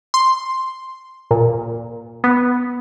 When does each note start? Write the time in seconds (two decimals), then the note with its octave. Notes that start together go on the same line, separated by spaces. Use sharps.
0.14 C6
1.31 A#2
2.24 B3